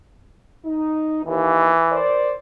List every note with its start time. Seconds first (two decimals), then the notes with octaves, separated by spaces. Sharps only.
0.65 D#4
1.25 D#2 E3
1.91 A#4 C5 D5